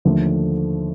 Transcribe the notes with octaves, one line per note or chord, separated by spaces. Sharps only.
D#2 D3 F3 A3